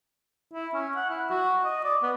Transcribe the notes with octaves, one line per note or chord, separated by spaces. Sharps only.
E4
C#4
F#5
E4
F#4
D#5
D5
B3